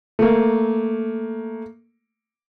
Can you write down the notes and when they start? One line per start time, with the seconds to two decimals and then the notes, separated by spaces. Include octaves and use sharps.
0.19 A3 A#3